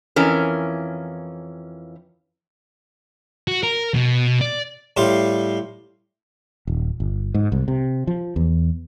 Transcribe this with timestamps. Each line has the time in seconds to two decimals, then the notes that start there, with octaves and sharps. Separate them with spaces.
0.16 F2 E3 C#4 A#4
3.48 F#4
3.63 A#4
3.94 B2
4.41 D5
4.97 A2 G3 G4 F5 C6
6.67 D#1
7.00 G1
7.34 G#2
7.52 C2
7.68 C3
8.07 F3
8.36 E2